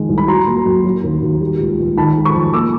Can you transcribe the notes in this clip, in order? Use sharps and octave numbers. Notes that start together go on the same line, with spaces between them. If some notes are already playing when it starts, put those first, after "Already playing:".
Already playing: F2 D#3 G#3
C2
B5
F#3 A#5 C6
A#3
F#2
F#3
D#2
D#2
G3
C#2
C#2
D#3 A5 B5
G#3
B5 C#6
F2
A#3 D6 E6